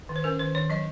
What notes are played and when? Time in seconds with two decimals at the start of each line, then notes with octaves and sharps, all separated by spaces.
0.09 D#3
0.16 C5
0.24 C#4 A#4
0.39 D#3 C5
0.55 D#3 C#5
0.70 F#3 D#5